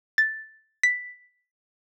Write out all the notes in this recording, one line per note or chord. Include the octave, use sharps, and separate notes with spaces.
A6
B6